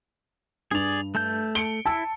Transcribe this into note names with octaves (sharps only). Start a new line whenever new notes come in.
G2 G#4 D5 F7
A3 A5 G6
C#7 D7 G7
E4 A5 E6